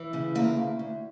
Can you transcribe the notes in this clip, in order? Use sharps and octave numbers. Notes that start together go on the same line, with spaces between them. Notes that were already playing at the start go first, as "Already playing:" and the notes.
Already playing: E3
C#3
D2 A#3
D2
D2